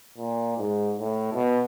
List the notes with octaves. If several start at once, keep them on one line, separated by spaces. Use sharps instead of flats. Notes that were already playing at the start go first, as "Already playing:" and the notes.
A#2
G#2
A2
B2